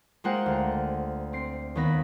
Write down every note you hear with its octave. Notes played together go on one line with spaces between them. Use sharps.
G#3 A#3 F4 C5 F#5 G5
D2
C4 C7
D#2 D#3 B3 B5 A#6